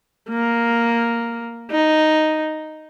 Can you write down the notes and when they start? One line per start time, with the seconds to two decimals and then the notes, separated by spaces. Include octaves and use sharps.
0.30 A#3
1.71 D#4